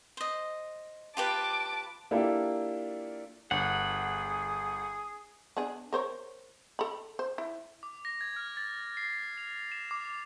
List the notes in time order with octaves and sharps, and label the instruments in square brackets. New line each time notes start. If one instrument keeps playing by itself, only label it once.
[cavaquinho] C5 D#5
[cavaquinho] F4 G4 B4 [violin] A5 D6
[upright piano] A#3 D4 E4 F4 G4 A4
[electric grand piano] G1 [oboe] G#4 [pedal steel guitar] F#5
[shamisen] B3 D4 G#4
A#4 C5 C#5
A4 B5
C5
E4
[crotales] D6
A#6
G#6
F6
A6
C7
F7
E7
D6